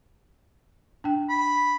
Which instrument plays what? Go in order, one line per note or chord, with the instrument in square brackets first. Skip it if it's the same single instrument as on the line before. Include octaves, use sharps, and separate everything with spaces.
[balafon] D4 G5
[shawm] B5